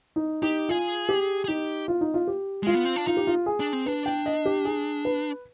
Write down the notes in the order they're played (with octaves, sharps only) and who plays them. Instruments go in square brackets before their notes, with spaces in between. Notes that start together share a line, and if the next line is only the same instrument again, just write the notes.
[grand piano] D#4
[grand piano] D#4 [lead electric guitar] G4
[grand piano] F4 [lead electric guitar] G#4
[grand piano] G4
[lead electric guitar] G#4
[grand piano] D#4 [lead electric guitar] G4
[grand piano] F4
D#4
F4
G4
[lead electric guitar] G#3 [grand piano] F4
[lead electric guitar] B3
C4
D4
[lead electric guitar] D#4 [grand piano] F4
[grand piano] G4
F4
G#4
[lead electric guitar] D4
C4
[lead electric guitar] D4 [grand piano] B4
[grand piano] G5
D#5
G4
G#4
B4